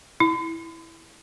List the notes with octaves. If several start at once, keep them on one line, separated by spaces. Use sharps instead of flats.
E4